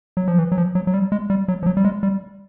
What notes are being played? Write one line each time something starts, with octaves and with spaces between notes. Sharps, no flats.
F#3
F3
E3
F#3
F3
F#3
F#3
G3
G#3
G3
F#3
F3
F#3
G3
G#3
G3